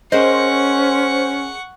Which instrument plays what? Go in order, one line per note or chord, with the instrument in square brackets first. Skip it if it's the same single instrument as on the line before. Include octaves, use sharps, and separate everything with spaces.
[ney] C#4 [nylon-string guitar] G#4 A#4 D#5 [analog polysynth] C5 [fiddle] F#5 C#6